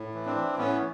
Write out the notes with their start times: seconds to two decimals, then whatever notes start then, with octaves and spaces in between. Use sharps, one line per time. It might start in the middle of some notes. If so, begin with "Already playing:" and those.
Already playing: A2
0.15 E3
0.26 C4 D4
0.37 E3
0.58 A2 B3 C#4